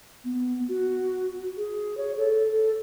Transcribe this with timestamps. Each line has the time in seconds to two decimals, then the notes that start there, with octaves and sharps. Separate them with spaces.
0.25 B3
0.68 F#4
1.57 G#4
1.97 C#5
2.18 A4
2.51 A4